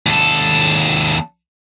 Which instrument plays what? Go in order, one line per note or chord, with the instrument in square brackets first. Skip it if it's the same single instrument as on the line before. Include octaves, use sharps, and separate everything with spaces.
[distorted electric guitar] D#2 A4